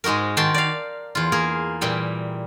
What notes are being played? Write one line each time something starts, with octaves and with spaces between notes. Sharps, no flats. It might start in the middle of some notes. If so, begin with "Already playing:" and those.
G#2 G#3 D#4 F#4 A#4
D#3 F#4 A#4 G5 A5 C6
D5 F5
E2 F4
A#3 G#4 A#4
A#2 E3 G3 G5